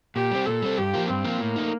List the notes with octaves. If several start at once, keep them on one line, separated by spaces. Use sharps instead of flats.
A#2 G4
G3 C4
A#2 A4
G3 C4
G2 G4
F3 A#3 F4
G2 C4
F3 A#3 F4
A2 A#3
A3 D#4